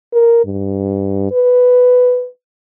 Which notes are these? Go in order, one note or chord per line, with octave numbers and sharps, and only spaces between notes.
A#4
G2
B4